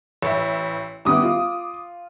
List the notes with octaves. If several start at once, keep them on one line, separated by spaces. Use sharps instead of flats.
A1 E5
G3 B3 E4 D6 D#6
F4